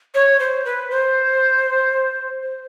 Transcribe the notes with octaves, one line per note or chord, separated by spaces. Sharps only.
C#5
C5
B4
C5
C5